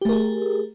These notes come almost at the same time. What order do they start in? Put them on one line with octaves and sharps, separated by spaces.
G4 A3 A#4 G#4